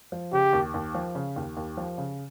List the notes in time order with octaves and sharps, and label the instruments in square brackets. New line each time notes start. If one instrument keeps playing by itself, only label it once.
[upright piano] F3
[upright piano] C#3 [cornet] G4
[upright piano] D#2
D#2
F3
C#3
D#2
D#2
F3
C#3